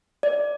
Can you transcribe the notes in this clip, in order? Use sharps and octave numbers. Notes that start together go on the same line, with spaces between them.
D5